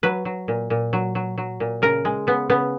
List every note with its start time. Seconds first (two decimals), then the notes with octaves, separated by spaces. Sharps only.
0.03 F#3 B4
0.25 F#3
0.48 A#2
0.70 A#2
0.93 F#3
1.15 F#3
1.38 F#3
1.60 A#2
1.82 C#3 A#4
2.05 G#3
2.27 C#3 B3
2.49 C#3 B3